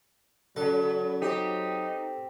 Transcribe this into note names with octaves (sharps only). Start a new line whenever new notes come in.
C#3 F#3 A4
C4 D#4 G4